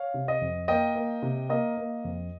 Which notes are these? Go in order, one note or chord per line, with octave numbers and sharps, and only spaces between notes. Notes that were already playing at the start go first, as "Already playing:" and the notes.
Already playing: C#5 F5
C3
D#5
F2
A#3 D#5 G5
A#3
C3
A#3 D#5
A#3
F2